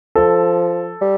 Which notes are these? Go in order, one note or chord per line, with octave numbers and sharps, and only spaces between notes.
F3 A4
G3